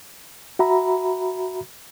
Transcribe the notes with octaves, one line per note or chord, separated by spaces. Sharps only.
F#4 E5 A#5 B5